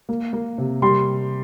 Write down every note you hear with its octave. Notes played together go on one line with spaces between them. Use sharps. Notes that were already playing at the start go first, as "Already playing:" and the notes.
A#3
A#3
C3
G3 C6